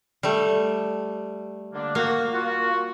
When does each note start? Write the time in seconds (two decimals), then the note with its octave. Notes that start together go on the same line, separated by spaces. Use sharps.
0.23 G3 A3
1.73 D3 A#3 D4
1.95 A#3 F#4
2.33 F4 F#4